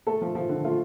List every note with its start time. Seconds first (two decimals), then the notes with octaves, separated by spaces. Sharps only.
0.07 A3 A4
0.21 F3
0.35 F3
0.49 D3
0.64 A3 F4